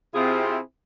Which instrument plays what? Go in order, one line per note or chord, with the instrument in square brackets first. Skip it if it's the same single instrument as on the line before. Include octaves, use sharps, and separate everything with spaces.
[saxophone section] C3 G#4 [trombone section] C4 E4 F4